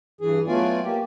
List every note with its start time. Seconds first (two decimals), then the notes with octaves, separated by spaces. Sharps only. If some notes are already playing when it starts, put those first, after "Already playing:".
0.21 G2 E3 G#4
0.47 F#3 A3 B3 F4 D5 G#5
0.84 A#3 G4